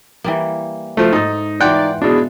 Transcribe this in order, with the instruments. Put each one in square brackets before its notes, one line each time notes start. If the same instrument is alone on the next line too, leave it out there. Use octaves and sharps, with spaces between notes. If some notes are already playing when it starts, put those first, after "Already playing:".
[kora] E3 G3 A#3
[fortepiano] F3 A3
[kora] G#2 A4 [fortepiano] D#4
[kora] E3 F4 [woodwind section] D#4 D5 [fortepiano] F#5 G5 F#6
[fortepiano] B2 D4 [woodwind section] E4 G#4